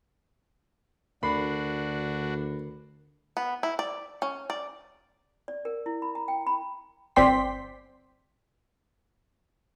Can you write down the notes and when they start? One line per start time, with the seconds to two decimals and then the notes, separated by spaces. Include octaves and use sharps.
1.23 D2 D3 D4 F#4 A#4 B5 C7
3.37 B3
3.63 E4
3.79 D5
4.22 C#4
4.50 D5
5.48 D5
5.65 A#4
5.86 E4
6.02 B5
6.15 A#5
6.28 G5
6.47 B5
7.16 G1 C4 D5 G5 C6 B6